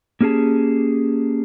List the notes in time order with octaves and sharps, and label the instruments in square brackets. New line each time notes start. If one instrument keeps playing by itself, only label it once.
[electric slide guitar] A#3 C#4 G4 G#4 A5